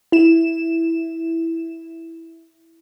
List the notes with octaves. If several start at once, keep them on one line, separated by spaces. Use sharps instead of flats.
E4 E7